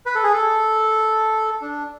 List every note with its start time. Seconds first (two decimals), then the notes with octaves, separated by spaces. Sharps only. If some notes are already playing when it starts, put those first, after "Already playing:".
0.06 B4
0.15 A4
0.24 G#4
0.33 A4
1.62 D4